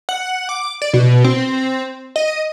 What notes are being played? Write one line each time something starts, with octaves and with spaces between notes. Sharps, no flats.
F#5
D6
D5
B2
C4
D#5